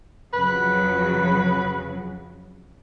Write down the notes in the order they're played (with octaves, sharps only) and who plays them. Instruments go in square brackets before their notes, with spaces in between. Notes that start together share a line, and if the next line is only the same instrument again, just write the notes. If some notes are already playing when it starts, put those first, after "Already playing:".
[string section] F2 C#3 F#3 [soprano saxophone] B4